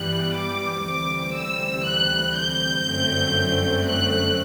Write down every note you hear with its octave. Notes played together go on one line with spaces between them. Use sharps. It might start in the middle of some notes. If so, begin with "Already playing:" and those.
Already playing: G2 E3 G3 B3 F#6
D6
D2 C3 E3 G3 C4 D6
E6
F#6
G6
G1 F#2 D3 A3 C4
F#6